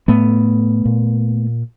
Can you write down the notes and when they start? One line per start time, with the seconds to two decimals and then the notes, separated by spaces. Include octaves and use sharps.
0.08 A2 A3 B3
0.85 A#2